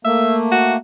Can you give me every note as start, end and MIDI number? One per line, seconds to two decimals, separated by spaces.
0.05 0.77 57
0.05 0.77 58
0.05 0.36 76
0.52 0.74 66